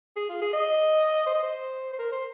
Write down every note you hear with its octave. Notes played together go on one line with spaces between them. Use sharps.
G#4
F4
G#4
D#5
C5
D#5
C5
C5
A#4
C5